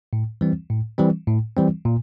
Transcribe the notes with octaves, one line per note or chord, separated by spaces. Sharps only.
A2
E3 G3 C4
A2
E3 G3 C4
A2
E3 G3 C4
A#2